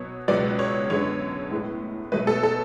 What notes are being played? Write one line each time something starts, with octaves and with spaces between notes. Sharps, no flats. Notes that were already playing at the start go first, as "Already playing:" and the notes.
Already playing: B2 F#3 B3 C#5
C#2 B2 F#3 B3 D5
C#5
F#2 D3 G#3 B3 C#5
A2 G#3 B3
B2 F#3 A3 B4
A4
A4